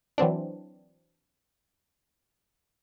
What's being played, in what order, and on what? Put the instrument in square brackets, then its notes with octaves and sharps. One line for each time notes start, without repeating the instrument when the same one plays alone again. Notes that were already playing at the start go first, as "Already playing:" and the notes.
[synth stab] E3 F#3 C4 D4